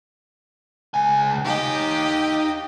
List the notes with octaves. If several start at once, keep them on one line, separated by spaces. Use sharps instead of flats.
C#2 G#5
D#4 G4 D#5 F5